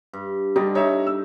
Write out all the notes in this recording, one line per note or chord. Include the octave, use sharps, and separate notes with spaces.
G2
D3 G3 D#4 G4
D#4 C#5 E5
E6